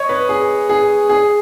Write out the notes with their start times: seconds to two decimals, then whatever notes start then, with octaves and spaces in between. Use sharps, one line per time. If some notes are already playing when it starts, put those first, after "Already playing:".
Already playing: C#5 D#5
0.09 B4
0.29 G#4
0.69 G#4
1.09 G#4